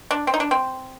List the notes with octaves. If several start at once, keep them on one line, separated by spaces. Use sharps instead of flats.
D4
C4
D#4
D4
C4